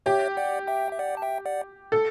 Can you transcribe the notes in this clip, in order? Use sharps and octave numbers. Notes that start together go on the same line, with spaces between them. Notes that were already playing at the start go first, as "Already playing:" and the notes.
G4 C#5 E5
D5 F#5
E5 G5
E5
D5 F#5
A5
E5 G5
D5 F#5
A4